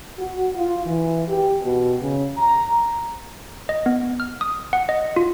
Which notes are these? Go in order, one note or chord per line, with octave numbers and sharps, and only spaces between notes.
F#4
F4
E3
G4
B2
C#3
A#5
D#5
B3
F6
D#6
F#5
D#5
F4